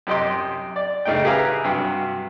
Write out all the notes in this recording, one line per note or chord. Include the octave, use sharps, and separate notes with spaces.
F#2 C3 G4 D#5 G5 C6
D5
A2 C#3 A3 D#4 G5
G4 G#4 B4 E5 F5 A#5
G2 C3 F#3